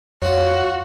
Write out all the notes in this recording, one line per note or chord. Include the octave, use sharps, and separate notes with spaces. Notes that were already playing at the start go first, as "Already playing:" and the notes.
F2 D4 F4 F#4 C#5 F#5